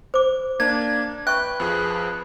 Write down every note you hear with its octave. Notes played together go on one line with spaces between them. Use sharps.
C5 D6
A#3 D4 G#6
B4 E5 G5 C#6 F#6
F2 F3 G#4